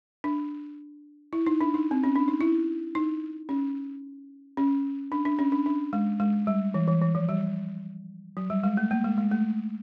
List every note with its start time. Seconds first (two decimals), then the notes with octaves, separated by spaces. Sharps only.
0.24 D4
1.33 E4
1.47 D#4
1.61 D4
1.74 D#4
1.91 C4
2.04 C#4
2.16 D4
2.28 D#4
2.41 E4
2.95 D#4
3.49 C#4
4.57 C#4
5.12 D4
5.25 D4
5.39 C#4
5.52 D4
5.66 D4
5.93 G#3
6.20 G#3
6.47 G3
6.74 E3
6.87 E3
7.01 E3
7.15 F3
7.29 G3
8.37 F#3
8.50 G3
8.63 G#3
8.77 A3
8.91 A#3
9.04 G#3
9.18 G#3
9.32 A3